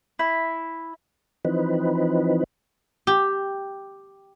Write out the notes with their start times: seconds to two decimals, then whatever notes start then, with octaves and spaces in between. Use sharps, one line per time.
0.19 E4
1.45 E3 F3 C4 D#4 B4
3.07 G4